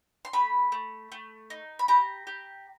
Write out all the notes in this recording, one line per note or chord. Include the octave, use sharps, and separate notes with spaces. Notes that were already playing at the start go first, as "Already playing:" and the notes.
C6
A3 B5
A3
A3
D#4
B5
G4 A#5
G4